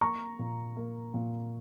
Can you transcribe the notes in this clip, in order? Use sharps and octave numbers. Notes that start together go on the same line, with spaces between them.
A#3 A#5 C#6
A#2
A#3
A#2